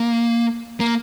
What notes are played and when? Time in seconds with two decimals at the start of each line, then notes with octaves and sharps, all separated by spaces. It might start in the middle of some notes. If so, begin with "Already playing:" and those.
Already playing: A#3
0.80 A#3